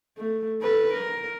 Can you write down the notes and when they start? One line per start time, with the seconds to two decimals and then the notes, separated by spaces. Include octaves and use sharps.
0.18 A3
0.62 A4 B4
0.94 A#4